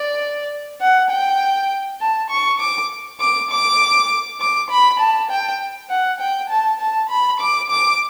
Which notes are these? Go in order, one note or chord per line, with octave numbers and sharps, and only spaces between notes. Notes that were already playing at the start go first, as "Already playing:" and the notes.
Already playing: D5
F#5
G5
A5
C#6
D6
D6
D6
D6
B5
A5
G5
F#5
G5
A5
A5
B5
D6
D6